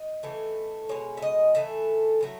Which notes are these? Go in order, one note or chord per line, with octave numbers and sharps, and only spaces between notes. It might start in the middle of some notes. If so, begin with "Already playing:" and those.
Already playing: D#5
A2 E3 A3
B2 G#3 C#5
E5
D#5
A2 E3 A3 E5
A2 F#3 A3